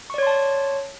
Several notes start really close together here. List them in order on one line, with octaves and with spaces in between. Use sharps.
C#6 D5 C#5 C6 A5